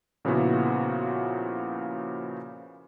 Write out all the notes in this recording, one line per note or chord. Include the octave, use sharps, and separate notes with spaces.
A#2 C#3 F3 B3 E4 F#4